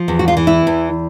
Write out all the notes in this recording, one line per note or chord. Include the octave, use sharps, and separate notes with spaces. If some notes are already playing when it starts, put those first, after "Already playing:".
Already playing: F3
E2
F#4
F4
E3
E4
E2